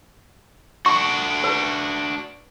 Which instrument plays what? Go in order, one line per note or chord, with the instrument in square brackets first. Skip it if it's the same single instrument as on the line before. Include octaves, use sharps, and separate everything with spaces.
[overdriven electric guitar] D4 F#4 [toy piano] C#6
[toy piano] B4